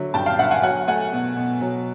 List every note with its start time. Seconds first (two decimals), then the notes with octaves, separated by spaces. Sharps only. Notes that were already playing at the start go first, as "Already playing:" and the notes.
Already playing: D3 F#3 E5
0.14 G2 G5 A5
0.26 F5 G5
0.39 G2 E5 F#5
0.51 F#5 G#5
0.63 F#3 F#5 G#5
0.87 A3 F#5 G#5
1.12 B2
1.37 B2
1.61 F#3